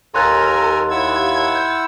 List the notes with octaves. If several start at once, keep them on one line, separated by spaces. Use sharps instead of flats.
D#2 A4 A#4 G#5 A#5 C6 F#6 A6
E4 F#5 E6 G#6
G6